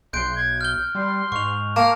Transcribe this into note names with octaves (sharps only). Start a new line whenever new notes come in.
B1 C6 F#6 G6 D7
G#6
F6 G6 G7
G3 C6
G#2 C#6 F7
A#3 A5 F6